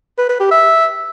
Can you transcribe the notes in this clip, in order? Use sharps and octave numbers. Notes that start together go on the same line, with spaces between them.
B4
B4
G4
E5